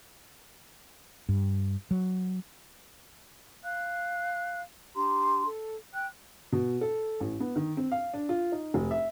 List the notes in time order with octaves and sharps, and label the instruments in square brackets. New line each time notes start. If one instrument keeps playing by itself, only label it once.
[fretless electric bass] G2
F#3
[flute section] F5 F#6
D4 G4 A#5 C6
A4
G5 F#6
[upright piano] B2
A4
A1
B3
D#3
C4
F5
D4
F4
D#4
F1
E5